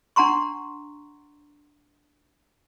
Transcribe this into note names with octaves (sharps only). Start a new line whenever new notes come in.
D4 F#5 A#5 C6 C#6